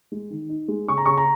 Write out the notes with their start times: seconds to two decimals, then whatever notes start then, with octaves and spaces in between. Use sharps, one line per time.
0.12 G#3
0.30 D#3
0.49 D#4
0.68 G#3
0.88 C#3 C#6
0.98 A#5
1.06 C#3 C#6
1.17 A#5